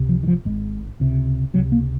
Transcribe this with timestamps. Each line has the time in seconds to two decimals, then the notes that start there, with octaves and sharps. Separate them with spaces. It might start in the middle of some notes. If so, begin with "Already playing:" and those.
Already playing: C#2 C3
0.09 F3
0.23 D#3
0.28 F3
0.45 G#1 G#2 G#3
1.00 C#2 C3
1.54 C3 F#3
1.57 C#2
1.72 A#3